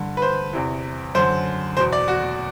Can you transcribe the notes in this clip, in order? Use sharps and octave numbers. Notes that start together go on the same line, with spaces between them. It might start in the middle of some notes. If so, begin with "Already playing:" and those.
Already playing: G2 D3
B4
C5
E2 C3 E3
F#2 D3 C5
E2 B2 C5
D5
F#4